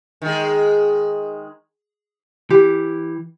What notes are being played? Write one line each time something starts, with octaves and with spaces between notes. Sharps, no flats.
D#3 G#3
E3 G4